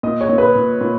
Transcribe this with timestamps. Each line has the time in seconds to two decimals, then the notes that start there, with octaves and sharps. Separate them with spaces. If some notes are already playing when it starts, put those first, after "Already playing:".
0.03 A#2 D#5
0.21 C#5
0.29 A#2
0.38 B4
0.55 A#2
0.81 A#2